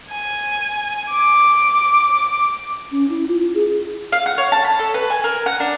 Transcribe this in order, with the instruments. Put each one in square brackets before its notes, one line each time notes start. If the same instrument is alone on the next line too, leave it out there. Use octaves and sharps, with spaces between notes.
[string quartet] G#5
D6
[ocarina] C#4
E4
F4
G#4
[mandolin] F5
F#5
C#5
A5
B5
A4
B4
G#5
A#4
F#5
D4